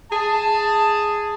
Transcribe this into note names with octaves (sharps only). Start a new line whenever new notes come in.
G#4 A5